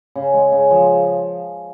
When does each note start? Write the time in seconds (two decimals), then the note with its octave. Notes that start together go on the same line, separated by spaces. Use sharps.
0.15 C#3
0.34 G#3
0.52 C#3
0.71 F3